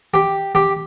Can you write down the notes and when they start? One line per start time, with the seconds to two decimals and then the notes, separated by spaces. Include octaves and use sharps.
0.14 G4
0.55 G4